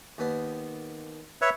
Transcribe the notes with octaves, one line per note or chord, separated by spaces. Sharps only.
D#2 B3
B4 C#5 E5